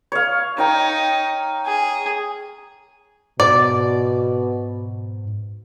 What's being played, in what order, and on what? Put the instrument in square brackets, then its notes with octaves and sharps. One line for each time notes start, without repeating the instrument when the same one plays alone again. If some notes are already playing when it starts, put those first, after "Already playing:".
[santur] C#5 F5
[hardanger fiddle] D#4 [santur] C#5 G5 A#5
[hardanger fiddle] G#4
[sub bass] G#2 [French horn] B2 [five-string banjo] D5